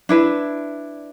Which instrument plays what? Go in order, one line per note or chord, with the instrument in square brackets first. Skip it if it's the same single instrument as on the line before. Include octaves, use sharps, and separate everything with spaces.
[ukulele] D4 E4 B4